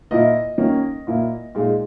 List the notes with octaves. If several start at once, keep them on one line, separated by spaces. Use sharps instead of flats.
A#2 A#3 E4 D#5
D#3 A#3 C#4
A#2 A#3 E4
A#2 G#3 D#4